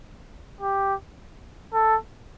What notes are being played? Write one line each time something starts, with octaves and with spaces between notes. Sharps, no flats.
G4
A4